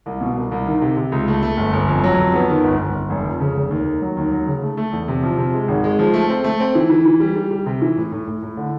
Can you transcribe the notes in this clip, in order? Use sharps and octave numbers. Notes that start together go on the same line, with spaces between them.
C2
B2
C2
C2
D#3
C3
C3
C#2
A3
A3
G1
G1
F2
F#3
F2
B3
D#3
G1
G1
G1
F1
F2
C#3
F1
D#2
D#3
F#3
D#2
F#3
C#3
A3
A3
E2
C3
F3
C3
G#3
G#1
G#3
F3
A3
C4
A3
C4
E3
E3
E3
G3
G3
G3
C3
E3
A2
A2
A2
A2
D3